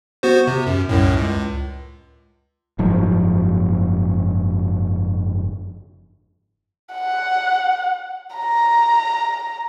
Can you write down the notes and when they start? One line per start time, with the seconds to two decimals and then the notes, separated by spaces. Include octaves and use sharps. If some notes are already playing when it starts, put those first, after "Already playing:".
0.23 B3 F#4 C5
0.47 C3
0.67 F#2
0.89 C2 F#2 A2
1.17 C#2
2.79 F#1 G#2 F3
6.94 F#5
8.36 A#5